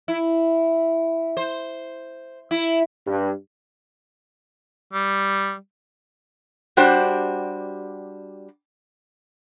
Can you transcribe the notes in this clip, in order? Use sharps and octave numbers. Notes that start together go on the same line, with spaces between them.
E4
C5
E4
G2
G3
G3 D4 F#4 G4 C5